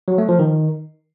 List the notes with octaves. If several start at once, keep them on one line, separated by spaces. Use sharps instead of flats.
F#3
A3
F3
D#3